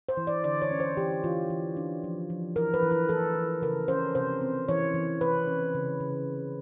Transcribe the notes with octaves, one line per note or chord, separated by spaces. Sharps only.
C5
E3
D5
D3 D5
C#5
C#4
C5
E3 G4
E3 F4
E3
D4
F3
F3
E3 A#4
B4
E3
B4
E3 A4
E3
C#3 A#4
C#4 C5
C3 C5
C4
E3 C#5
E3
C3 B4
C#4
C#3
C#3